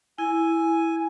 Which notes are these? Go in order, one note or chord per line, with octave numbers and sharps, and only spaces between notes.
E4 G#5